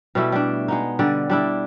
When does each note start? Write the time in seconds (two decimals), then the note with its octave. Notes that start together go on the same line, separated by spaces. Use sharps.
0.15 B2 G3 A3 E4
0.32 G3 D4
0.68 G#3 B3 D#4
0.99 D3 G3 D5
1.30 G3 D4 E4